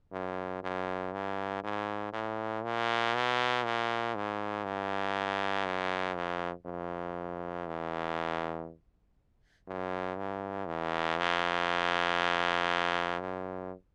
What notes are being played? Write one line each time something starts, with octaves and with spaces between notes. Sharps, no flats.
F#2
F#2
G2
G#2
A2
A#2
B2
A#2
G#2
G2
F#2
F2
F2
E2
F#2
G2
E2
F2
F#2